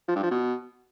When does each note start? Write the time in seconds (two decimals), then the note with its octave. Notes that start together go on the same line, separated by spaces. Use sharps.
0.08 F3
0.16 G2
0.23 F3
0.31 B2